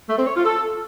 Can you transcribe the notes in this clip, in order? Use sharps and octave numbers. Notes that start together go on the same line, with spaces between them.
A3
C4
C#5
F4
A4